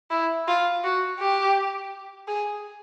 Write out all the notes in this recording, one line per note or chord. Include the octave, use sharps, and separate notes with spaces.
E4
F4
F#4
G4
G#4